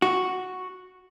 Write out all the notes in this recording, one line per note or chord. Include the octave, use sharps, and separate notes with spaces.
F#4